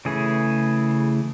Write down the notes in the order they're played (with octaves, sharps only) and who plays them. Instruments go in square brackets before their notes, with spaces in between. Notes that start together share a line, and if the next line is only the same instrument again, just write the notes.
[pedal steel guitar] C#3 E3 A3 G#4